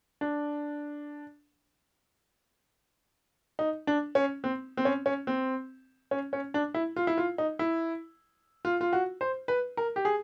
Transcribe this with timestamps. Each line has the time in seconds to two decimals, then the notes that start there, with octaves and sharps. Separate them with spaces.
0.21 D4
3.59 D#4
3.87 D4
4.15 C#4
4.44 C4
4.77 C4
4.85 C#4
5.06 C#4
5.27 C4
6.11 C#4
6.33 C#4
6.54 D4
6.74 E4
6.96 F4
7.07 E4
7.18 F4
7.38 D#4
7.59 E4
8.65 F4
8.81 F4
8.93 F#4
9.21 C5
9.48 B4
9.77 A#4
9.96 G4
10.05 G#4